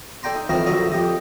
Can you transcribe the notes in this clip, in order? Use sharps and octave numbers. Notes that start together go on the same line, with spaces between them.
A4 D5 G5 A#5 C6
D#4
F2 D#3 E3 C4 D#5 A#5
A#1 F#2 D3 E5 A#5 D#6
F2 G4 D#5